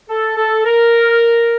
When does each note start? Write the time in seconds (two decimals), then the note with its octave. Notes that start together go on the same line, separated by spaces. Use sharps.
0.08 A4
0.36 A4
0.65 A#4